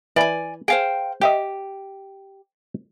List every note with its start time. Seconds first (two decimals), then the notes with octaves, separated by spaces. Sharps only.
0.16 E3 D5 G#5
0.68 G#4 C5 F5 G5
1.21 G4 D#5 E5 G5